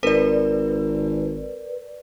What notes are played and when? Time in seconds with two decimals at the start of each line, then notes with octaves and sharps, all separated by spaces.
0.03 G#1 A#4 B4 D5